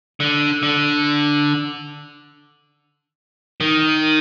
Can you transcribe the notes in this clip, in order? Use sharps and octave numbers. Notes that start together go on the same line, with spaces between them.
D3
D3
D#3